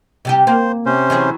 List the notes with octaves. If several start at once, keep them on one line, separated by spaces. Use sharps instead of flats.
C3 G3 G4
A#3 C5
C3 C#4 C5
E3 F#3 G#4